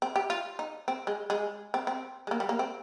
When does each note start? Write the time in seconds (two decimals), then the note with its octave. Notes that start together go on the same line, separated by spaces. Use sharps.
0.02 C4
0.16 G4
0.30 F4
0.59 D#4
0.88 C4
1.07 G#3
1.30 G#3
1.74 C4
1.87 C4
2.27 G#3
2.31 A#3
2.40 G3
2.49 A#3
2.59 C4